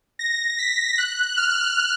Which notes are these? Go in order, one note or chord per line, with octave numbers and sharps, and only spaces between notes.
A#6
B6
F#6
F6